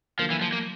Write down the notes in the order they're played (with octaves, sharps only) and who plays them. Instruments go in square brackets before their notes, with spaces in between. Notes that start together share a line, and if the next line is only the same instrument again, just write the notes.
[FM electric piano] D3 F#3 A#3 [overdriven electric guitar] F3
[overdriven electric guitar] E3
F3
A#3